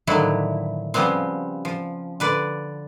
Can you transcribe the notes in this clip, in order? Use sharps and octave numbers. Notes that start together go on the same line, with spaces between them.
A2 D3 D#3 F3 F#3 E4
C#3 F3 G3 B3 C4
F3
D3 B4 D5